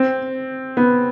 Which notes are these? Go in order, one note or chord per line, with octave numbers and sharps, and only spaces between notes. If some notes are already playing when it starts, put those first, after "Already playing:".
Already playing: C4
B3